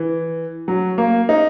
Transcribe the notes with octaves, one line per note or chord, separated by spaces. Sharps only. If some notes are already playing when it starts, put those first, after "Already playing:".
Already playing: E3
F#3
A#3
D#4